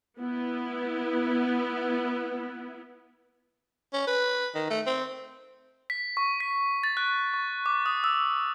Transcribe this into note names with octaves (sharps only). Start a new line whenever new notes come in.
B3 E4
C#4
B4
D#3
A3
C4
B6
C#6
B6
A6
F#6
C#6
D6
D#6
E6